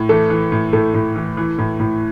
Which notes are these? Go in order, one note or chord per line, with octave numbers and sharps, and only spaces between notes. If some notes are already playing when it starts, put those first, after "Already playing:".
Already playing: A2
E3 A3 A4
E3
A2
A2 A3 A4
A2
E3
E3
A2
A2